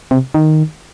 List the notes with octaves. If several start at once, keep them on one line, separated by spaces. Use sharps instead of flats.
C3
D#3